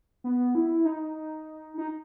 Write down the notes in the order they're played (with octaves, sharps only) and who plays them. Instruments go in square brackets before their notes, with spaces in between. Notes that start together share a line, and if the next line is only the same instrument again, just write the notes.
[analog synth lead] B3
E4
D#4
D#4